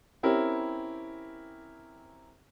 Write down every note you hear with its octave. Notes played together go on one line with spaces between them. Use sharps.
C4 C#4 E4 G4 A#4